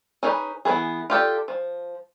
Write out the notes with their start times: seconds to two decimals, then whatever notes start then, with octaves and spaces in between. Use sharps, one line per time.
0.23 C#4 D#4 G#4 A#4 B4
0.65 E3 F3 B3 G#4
1.10 F4 G4 A4 D5
1.48 F3